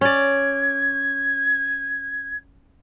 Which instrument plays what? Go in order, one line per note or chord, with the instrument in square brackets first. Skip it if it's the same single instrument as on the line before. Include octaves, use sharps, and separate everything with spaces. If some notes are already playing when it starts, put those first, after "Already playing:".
[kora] C#4 D5 [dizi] G#6